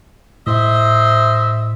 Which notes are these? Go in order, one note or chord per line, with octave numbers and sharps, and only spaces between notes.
A2 C5 D#5 E5